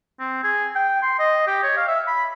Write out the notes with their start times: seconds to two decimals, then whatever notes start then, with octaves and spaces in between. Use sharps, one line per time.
0.20 C4
0.44 G#4
0.75 G5
1.02 C6
1.19 D#5
1.47 G4
1.63 C#5
1.77 F5
1.88 E5
2.07 B5